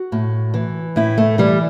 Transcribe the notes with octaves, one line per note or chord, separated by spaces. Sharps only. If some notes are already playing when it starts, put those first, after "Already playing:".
Already playing: F#4
A2
E3
A2 E4
A3
E3 G3